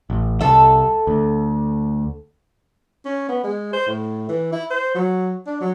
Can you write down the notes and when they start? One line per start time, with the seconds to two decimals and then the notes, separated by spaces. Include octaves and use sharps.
0.10 A1
0.41 C2 A4 E5
1.07 D2
3.05 C#4
3.29 B3
3.44 G#3
3.73 C5
3.87 A2
4.29 E3
4.53 E4
4.70 C5
4.95 F#3
5.47 D4
5.61 F#3